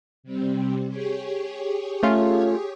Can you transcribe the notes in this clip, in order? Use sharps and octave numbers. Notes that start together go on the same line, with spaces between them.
C3 G3 C4
G4 G#4 C#5
A3 C#4 F4